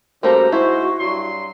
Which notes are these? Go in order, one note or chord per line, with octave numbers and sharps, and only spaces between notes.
C#3 G3 A3 A#3 F#4 C5 A#5
G#2 E4 C5 C#6
G2 F#3 C6